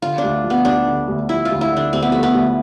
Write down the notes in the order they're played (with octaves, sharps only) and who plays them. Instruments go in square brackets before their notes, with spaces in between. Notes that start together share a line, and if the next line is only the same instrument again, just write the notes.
[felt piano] D3 [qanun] F4
[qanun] D4
[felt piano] D2
F3
[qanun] B3
[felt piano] D2 [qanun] D4
[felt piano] D3
D2
[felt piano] F3 [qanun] E4
[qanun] F4
[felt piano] D2
[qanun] E4
[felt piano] D3
[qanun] D4
[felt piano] D2 [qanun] C4
[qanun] B3
[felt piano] F3 [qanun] A3
[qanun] B3
[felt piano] D2